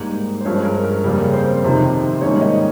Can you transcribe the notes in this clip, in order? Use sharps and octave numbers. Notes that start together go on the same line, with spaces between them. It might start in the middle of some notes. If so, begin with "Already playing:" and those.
Already playing: G#2 G3 A#3 A#4
C5
G2 F3 G#3 C#4 C#5
A#4
A#4
F2 C#3 G3 A#3 A#4
C4 C5
F2 C3 D#3
G#2 D#3 G3 A#3 C#4 C#5
D#4 D#5